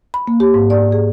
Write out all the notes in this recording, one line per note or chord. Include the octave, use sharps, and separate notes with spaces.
B5
A#3
G4
G#2
D5
G#4